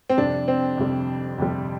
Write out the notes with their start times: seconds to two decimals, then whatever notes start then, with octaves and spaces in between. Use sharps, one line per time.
0.10 C4
0.17 F2 C3 G3 D4
0.48 C4
0.78 F2 C3 G3
1.38 F2 C3 G3